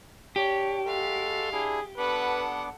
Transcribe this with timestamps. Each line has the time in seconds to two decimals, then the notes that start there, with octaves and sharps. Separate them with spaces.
0.36 D4 G4 C#5
0.87 G#3 F#4 A4 F5
1.52 D4 E4 G#4
1.98 B3 D4 A4 B4 F#5 D6